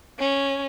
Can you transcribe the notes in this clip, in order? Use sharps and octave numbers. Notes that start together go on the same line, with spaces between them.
C#4